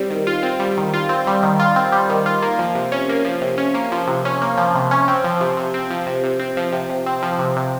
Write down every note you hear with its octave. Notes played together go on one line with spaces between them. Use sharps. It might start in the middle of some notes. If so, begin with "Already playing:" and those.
Already playing: G3 C4
D#3
F4
C4
G3
D#3
F4
C4
G3
D#3
F4
C4
G3
D#3
F4
A#3
F3
C3
C#4
A#3
F3
C3
C#4
A#3
F3
C3
C#4
A#3
F3
C3
C#4
C4
F3
C3
C3
C4
F3
C3
C3
C4
F3
C3
C3
C4
F3
C3
C3